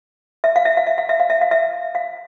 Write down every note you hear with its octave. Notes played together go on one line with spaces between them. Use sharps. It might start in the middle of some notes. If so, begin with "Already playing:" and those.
E5
F5
E5
F5
E5
F5
E5
F5
E5
F5
E5
F5